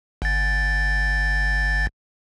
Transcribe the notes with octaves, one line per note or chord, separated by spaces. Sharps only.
G1 A6